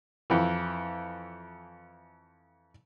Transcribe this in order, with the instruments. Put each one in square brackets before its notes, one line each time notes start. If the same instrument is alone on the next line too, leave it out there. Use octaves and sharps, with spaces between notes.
[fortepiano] F2 E3